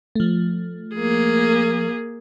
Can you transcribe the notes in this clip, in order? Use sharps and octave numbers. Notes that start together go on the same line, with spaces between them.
F3 A3
A#3 G#4